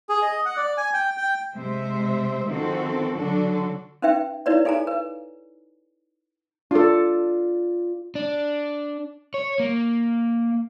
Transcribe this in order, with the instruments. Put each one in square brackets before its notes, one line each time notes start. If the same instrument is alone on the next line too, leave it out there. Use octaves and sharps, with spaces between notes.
[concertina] G#4
D#5
F#5
D5
G#5
G5
G5
[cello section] C3 G#3 C5 E5
D#3 F3 C4 F#4 A4
D3 F#3 D4 F#4 A4
[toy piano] C#4 D#4 B4 E5 G5
D#4 E4 B4 C#5 D5
D#4 G#4 A4 G#5 A#5
B4
[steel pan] D4 A4 [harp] F4 D5
[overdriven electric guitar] D4
C#5
A#3